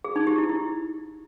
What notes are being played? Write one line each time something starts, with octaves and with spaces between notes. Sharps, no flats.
G#4
D#4
G4
E4
E4